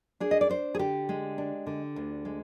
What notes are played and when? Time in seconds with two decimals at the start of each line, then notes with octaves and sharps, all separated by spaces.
0.20 D4 G#4
0.31 D#5
0.41 D5
0.50 D4 C5
0.75 G#4
0.79 D3 G4
1.09 G#3
1.38 D4
1.67 D3
1.96 D2
2.25 G#3